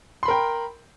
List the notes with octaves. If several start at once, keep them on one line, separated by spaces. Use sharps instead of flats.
A#4 G5 B5 C6